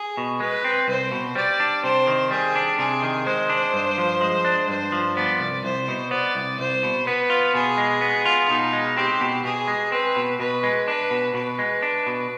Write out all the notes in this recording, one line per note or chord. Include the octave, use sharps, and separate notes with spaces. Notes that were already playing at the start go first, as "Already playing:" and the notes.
Already playing: G#4
B2
G#3 B4
C4
C2 C5
B2
G3 D5
D4
C3 C5
D#3
G3 G#4
D4
C3 G#4
D#3
G#3 C5
D4
G2
F3
G#3
D4
G2 C5
F3
B3 D5
C2
C2 C5
B2
B3 D5
C2
C2 C5
B2
B3 B4
F4
B2 G#4
G#3
B3
F4
B2 D#4
G#3
C4 G4
B2
B2 G#4
G#3
C4 B4
B2
B2 B4
G#3
D4 B4
B2
B2 B4
G#3
D4
B2